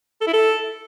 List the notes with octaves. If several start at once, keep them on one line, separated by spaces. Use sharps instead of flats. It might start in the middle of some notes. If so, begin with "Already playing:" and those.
A4
E4
A4